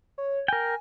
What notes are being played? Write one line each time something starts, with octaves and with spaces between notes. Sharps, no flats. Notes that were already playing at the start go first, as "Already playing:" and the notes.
C#5
A#4 G5 G#5